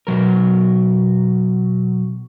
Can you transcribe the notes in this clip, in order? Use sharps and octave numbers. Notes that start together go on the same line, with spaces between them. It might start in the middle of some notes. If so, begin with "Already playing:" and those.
B2 F#3 A#4